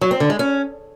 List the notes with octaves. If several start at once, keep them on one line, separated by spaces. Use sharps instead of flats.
F#3
C4
D3
G#3
C#4